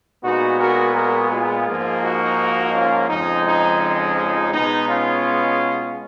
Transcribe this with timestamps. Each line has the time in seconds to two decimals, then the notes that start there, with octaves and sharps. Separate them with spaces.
0.23 A#2 G#3 B3 D#4 F#4
0.60 F#4 A#4
0.95 F#4 A#4
1.30 F4 G#4
1.67 G#2 F3 A#3
2.03 D#4 F#4
2.73 C#4 F4
3.09 F2 C#3 F3 G#3 D#4
3.45 D#4
3.81 D#4
4.52 B2 G#3 B3 D#4
4.89 C#4 F4